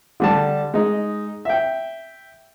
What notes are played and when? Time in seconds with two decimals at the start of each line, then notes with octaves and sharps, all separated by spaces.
0.20 D3 G3 A5
0.74 G#3 D#4
1.45 E5 G5